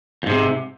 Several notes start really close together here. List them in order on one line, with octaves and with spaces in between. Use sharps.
F2 G#2 C3